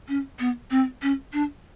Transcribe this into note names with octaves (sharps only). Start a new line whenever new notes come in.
C#4
B3
C4
C#4
D4